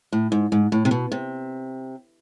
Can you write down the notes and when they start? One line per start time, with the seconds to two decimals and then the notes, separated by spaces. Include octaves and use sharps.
0.13 A2
0.32 G#2
0.52 G#2
0.72 A2
0.85 C3
0.91 B2
1.12 C3